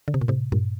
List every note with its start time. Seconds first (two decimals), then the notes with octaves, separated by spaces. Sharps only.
0.08 D3
0.14 C3
0.21 A#2
0.28 A2 C3
0.52 G2 A#2